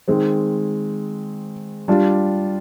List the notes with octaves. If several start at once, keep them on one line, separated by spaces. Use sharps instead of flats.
D#3 G#3 C4
G3 D4 F4